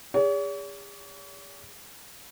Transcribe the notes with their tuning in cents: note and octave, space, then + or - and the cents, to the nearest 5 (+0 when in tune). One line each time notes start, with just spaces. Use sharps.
G#4 -45 C#5 +45